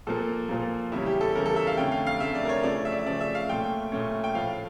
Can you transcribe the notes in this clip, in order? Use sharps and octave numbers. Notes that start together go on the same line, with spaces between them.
A#2 F3 A#3 A4
A#2 F3 A#3
E2 C#3 G3 C#4 E4
G4
A4
E2 C#3 G3 C#4 A#4
A4
E5
F5
F2 D3 A3 C#4 G5
F5
F5
F2 D3 A3 C#4 E5
D5
A#4
C#5
C#3 F3 A3 C#4 D5
E5
D5
E5
C#3 F3 A3 C#4 D5
E5
F5
A#2 A3 C#4 G5
A#2 A3 C#4
G5
A2 F3 A3 F5